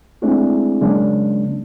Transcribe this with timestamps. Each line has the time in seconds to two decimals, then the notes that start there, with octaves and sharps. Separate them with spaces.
0.22 G#3 A3 C4 D4 E4 G#4
0.81 C#3 F#3 G#3 A#3 C#4 D4